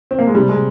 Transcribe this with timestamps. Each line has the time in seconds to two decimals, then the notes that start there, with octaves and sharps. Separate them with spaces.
0.11 C4
0.19 A#3
0.27 G#3
0.35 C3 G3
0.49 C3 G#3